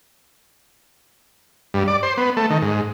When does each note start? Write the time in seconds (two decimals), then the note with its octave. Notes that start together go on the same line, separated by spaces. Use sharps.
1.74 G2
1.88 D5
2.03 C5
2.17 B3
2.37 A3
2.50 D#3
2.62 G#2